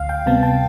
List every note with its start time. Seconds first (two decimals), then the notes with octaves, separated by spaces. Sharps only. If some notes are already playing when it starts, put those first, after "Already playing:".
Already playing: D2 F5
0.09 G5
0.26 C3 G3 B3 A5
0.43 A5